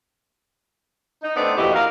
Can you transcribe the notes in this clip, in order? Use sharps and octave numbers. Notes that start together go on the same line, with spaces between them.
D#4
A3 B3 C4 D4 D#4 B4
F2 A#2 E4 F#4 G4 D#5
A#4 F5